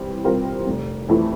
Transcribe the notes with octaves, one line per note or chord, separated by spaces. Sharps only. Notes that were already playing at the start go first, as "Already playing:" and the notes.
Already playing: E3 G3 C4
G3 C4 F4 A#4
F1
F2 E3 A3 E4